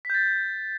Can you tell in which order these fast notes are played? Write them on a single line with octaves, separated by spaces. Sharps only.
B6 G6 A6